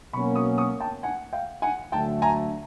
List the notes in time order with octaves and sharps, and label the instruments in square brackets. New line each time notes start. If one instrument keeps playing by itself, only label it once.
[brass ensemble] B2 F#3 A#3 C#4 [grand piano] B5 C#6
[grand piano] C#6 D#6
C#6 D#6
G5 A5
F#5 G#5
F5 G5
F#5 G#5
[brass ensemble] D2 D3 F#3 A3 [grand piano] G5 A5
[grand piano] G#5 A#5